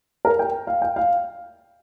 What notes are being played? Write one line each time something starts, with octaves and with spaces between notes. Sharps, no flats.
A#4
G5
F5
G5
F5